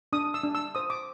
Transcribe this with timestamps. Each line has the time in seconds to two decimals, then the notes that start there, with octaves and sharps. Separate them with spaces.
0.13 D4 D#6
0.34 E6
0.43 D4
0.55 E6
0.75 C5 D#6
0.90 D6